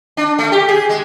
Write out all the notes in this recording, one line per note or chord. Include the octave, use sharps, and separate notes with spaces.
D4
A3
G4
G#4
G#3